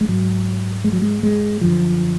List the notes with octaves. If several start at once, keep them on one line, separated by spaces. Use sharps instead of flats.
G#3
G#2 F#3
G#3
F#3
G#3
G#3
F#2 D3 F3